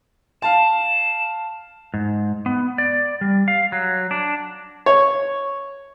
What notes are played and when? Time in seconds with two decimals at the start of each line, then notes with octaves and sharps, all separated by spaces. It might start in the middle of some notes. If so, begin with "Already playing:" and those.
0.42 F5 A5 E7
1.94 G#2
2.46 B3
2.78 D5
3.21 G3
3.48 F5
3.72 F#3
4.11 D4
4.86 C#5